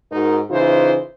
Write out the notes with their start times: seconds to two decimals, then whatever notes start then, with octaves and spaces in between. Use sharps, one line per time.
0.11 G#2 D#4 F#4 A#4
0.50 C#3 E3 D#4 F4 C5